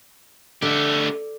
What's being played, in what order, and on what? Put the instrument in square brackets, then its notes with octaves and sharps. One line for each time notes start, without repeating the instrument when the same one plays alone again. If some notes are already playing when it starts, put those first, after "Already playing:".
[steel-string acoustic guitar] D3 [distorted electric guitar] A3 G4